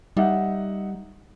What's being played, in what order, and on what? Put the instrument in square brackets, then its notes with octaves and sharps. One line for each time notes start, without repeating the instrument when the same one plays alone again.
[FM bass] G3 [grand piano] D#4 E5 F#5